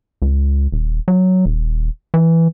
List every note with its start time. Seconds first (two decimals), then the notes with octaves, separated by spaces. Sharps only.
0.22 C#2
0.72 D#1
1.08 F#3
1.46 D#1
2.14 E3